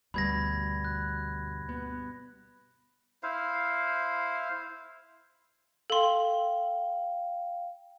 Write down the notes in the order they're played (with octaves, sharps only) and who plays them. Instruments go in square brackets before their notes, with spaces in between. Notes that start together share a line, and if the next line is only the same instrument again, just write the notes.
[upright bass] D2 [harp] G2 B2 G3 [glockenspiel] B5 G#6 A#6
[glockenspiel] F#6
[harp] B3
[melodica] E4 C5 F5
[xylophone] A4 C6 [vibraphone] F5 G5